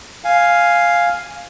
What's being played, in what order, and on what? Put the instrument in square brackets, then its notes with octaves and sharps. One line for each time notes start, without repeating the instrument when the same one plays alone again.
[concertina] F5 G#5